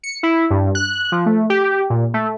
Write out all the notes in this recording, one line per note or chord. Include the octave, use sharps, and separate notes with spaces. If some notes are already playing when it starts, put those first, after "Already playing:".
C#7
E4
G2
F#6
F3
A3
G4
A#2
A3